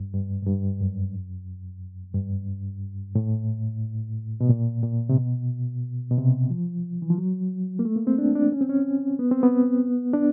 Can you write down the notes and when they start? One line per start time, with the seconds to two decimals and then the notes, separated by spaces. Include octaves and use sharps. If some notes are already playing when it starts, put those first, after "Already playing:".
Already playing: G2
0.13 G2
0.42 G#2
0.47 G2
0.81 F#2
2.14 G2
3.15 A2
4.40 B2
4.49 A#2
4.83 A#2
5.09 C3
5.17 B2
6.11 B2
6.18 C3
6.50 F3
7.02 E3
7.10 F3
7.18 F#3
7.79 A#3
7.85 A3
7.96 A#3
8.07 C4
8.18 D4
8.35 D4
8.52 C#4
8.61 C4
8.69 C#4
9.19 B3
9.31 C4
9.43 B3
10.13 D4